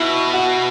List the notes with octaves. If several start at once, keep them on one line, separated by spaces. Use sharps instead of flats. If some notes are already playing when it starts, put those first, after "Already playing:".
Already playing: B2 E4
F#4